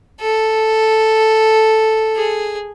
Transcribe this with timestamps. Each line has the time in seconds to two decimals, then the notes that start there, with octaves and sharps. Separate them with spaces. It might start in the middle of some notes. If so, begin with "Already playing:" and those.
0.20 A4
2.15 G#4